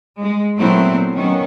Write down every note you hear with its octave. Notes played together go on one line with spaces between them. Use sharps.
G#3
A#2 F#3 A3 B3 C4 E4
D#3 F#3 B3 C#4